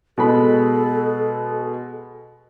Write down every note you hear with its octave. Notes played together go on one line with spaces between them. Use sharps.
B2 G#3 A4 B5